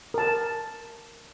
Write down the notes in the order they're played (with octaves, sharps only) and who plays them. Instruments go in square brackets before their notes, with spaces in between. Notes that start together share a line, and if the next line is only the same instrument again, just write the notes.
[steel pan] A#4 A5